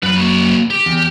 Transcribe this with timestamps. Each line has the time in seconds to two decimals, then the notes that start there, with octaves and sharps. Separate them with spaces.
0.03 F#2 B4 B5
0.16 A#3 F#4
0.70 G4
0.86 E2